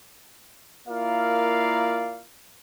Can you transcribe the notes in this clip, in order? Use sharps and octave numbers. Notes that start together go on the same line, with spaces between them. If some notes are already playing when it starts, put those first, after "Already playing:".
A#3 E4 F4 A#4 D5 F5